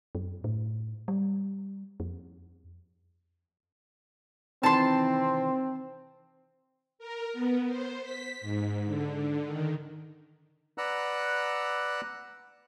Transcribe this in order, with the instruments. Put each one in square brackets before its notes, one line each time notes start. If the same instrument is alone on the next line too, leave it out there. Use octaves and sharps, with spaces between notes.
[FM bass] F#2
A2
G3
F2
[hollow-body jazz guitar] C3 D#3 E3 [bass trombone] C4 [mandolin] A5 C6
[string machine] A#4
B3
C5
B6
G#2
D3
D#3
[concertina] B4 D5 F#5 A#5 E6 F#6